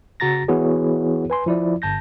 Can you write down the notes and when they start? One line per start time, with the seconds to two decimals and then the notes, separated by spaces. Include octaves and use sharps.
0.20 C#3 F#4 A#5 A6 A#6
0.48 E3 B3 E4 F#4 G#4 C#5
1.30 B4 G#5 C6
1.46 F3 E4 D5
1.82 G1 A5 G6 A#6